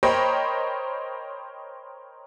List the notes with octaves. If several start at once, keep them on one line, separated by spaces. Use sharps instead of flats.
A#4 C5 C#5 D#5 G5 B5